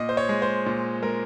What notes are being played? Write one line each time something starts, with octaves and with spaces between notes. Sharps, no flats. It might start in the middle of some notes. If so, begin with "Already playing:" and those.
Already playing: A#2 D#5
C5
C#5
G#3
C5
A#2
G#3 A#4